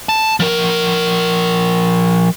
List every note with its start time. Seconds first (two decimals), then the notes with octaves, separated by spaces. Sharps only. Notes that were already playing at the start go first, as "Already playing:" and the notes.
0.09 A5
0.40 F3 A#4